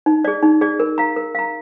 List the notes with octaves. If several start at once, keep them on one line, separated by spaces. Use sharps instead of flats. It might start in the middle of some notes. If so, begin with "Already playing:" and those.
D#4
G#4 D5
D#4
G#4 D5
A#4
F5 A#5
A#4
F5 A#5